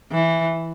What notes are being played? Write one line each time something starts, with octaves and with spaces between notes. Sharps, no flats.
E3